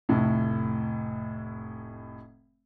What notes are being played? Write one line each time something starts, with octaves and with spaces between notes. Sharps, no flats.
F1 A2